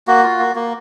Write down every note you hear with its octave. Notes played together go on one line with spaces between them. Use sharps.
A#3 F#4
F4
A#3
A#3